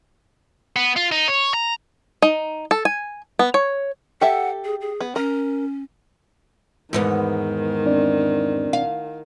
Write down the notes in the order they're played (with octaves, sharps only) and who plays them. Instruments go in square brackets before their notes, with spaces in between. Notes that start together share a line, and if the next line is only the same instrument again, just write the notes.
[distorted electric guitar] B3
F4
D#4
C#5
A#5
[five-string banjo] D#4
A4
G#5
B3
C#5
[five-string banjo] G4 A4 E5 [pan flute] F#5
[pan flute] G#4
G#4
[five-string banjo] B3
[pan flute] C#4 [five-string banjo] A#4
[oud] E2 G#2 B3 [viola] D#3
[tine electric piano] C4 D4 D5
[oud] F5